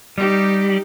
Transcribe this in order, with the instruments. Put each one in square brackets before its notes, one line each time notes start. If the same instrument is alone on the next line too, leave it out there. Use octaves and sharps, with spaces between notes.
[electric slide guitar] G3 [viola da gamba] D#4 G4